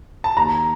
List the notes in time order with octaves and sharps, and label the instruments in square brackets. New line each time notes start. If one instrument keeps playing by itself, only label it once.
[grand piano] A5
D#2 A#5